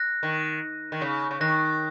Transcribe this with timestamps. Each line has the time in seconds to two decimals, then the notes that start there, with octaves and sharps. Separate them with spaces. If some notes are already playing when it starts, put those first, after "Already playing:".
Already playing: F#6 A#6
0.23 D#3
0.92 D#3
1.01 C#3
1.31 C#3
1.41 D#3 F#6 A#6